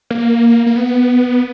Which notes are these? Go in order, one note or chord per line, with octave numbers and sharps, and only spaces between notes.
A#3
A#3
B3